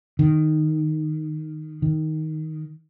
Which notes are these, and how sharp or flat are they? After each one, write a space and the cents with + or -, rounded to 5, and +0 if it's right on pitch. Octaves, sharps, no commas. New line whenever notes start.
D#3 -10
D#3 +10